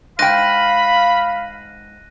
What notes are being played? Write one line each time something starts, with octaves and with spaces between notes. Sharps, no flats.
G#2 F5 G5 B5 F#6 A#6 D#7